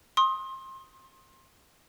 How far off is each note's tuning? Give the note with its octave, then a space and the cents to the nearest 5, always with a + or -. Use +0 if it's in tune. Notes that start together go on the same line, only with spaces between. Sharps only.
C6 +25 D#6 +15